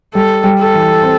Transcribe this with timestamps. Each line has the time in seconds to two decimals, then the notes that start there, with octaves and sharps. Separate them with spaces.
0.14 G3 A4
0.44 G3
0.59 A4
0.74 E3
1.03 C4